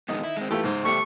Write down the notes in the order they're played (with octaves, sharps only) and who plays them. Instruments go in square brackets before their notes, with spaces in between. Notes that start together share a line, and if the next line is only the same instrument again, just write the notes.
[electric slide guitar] F2 G#3 B3 [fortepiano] D#3 D#4
[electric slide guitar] E4
G#3 C4
[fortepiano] E3 A3 F4 [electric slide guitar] G4
[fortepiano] G#2 [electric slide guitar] C#3 C5
[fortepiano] G3 A3 G4 [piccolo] C#6